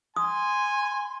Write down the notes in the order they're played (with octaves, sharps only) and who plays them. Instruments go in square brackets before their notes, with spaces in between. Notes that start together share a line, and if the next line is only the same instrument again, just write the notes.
[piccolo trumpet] G#5 [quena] C6 [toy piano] D#6